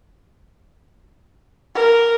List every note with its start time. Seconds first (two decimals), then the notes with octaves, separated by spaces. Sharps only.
1.75 A#4